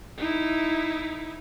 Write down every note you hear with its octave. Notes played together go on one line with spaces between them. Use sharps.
D#4 E4